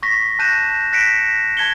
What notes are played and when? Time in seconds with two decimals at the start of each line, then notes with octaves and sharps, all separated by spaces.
0.03 C#6 A#6 B6
0.39 A5 F#6 G6 A#6 D#7 E7
0.92 F#6 A#6 B6 C#7 D7 E7
1.57 A5 G#6 C#7 G7